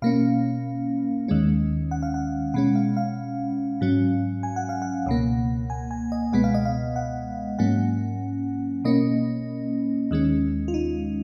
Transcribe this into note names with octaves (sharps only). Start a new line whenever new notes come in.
B2 A#3 C#4 F5
D#2 D#3 G#3 C#4
F#5
F5
F#5
B2 G#3 C#4 F#5
F5
F5
G#2 F#3 C#4
G#5
F#5
F5
F#5
C#2 B2 A#3
G#5
G#5
D#5
C#2 B2 G#3 B3 F#5
F5
D#5
F5
F#5
G#2 F#3 A#3 C#4 F#5
B2 A#3 C#4 D#5
D#2 D#3 G#3 C#4
F4
D#4